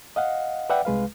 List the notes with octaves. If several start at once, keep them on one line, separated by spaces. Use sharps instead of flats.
D#5 F5 F#5
B4 D5 E5 F#5 G5
C2 G#3 B4 F5